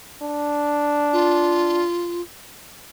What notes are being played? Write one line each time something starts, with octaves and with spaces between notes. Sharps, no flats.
D4
F4